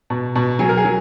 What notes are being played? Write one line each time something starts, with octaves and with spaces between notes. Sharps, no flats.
B2
B2
F#3 G#4
A#4
G#4
F#3